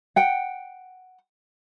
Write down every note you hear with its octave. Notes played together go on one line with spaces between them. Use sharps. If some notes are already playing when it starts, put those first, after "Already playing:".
F#5 G5